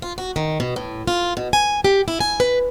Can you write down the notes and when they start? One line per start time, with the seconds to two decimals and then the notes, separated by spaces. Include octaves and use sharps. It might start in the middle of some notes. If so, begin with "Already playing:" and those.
0.02 F4
0.18 F#4
0.36 D#3
0.60 B2
0.76 A2
1.07 F4
1.37 B2
1.53 G#5
1.84 G4
2.08 E4
2.20 G#5
2.40 B4